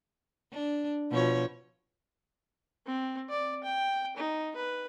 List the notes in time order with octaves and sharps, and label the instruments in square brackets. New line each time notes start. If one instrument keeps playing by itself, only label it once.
[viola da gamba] D4
B2 F3 C#5
[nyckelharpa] C4
D5
G5
D#4
B4